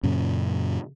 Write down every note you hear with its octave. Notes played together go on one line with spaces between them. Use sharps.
F#2 A#2 C#3